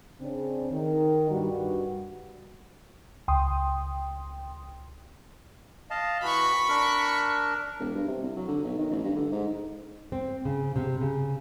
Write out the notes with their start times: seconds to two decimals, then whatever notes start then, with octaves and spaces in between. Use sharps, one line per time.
0.21 C#3 C4 D4
0.72 D#3
1.31 G2 G3 F#4
3.28 C#2 G5 C6 D#6
5.91 D#5 F5 A5
6.23 E3 F#4 B5 C#6
6.69 D4 A#4
7.80 E1
7.95 G2
8.08 C3
8.23 C2
8.37 F#3
8.48 D3
8.64 B1
8.79 D#3
8.91 A1
9.04 G2
9.16 D3
9.32 G#2
10.12 C4
10.45 C#3
10.76 C3
11.01 C#3